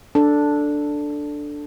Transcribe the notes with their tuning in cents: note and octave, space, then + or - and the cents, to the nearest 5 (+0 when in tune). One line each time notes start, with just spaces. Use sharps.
D4 +0 A4 +0